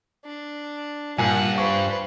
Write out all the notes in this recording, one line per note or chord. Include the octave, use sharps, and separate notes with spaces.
D4
G2 A#2 F#5 G#5
B4 C5 C#6